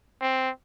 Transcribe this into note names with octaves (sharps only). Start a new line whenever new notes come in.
C4